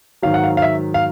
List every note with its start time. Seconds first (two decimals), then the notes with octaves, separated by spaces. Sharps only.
0.22 G#2 D#3 F#3 F5
0.34 F#5
0.44 F5
0.57 F5
0.62 E5
0.94 F5